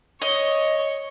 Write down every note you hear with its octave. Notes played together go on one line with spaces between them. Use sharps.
C#5 D#5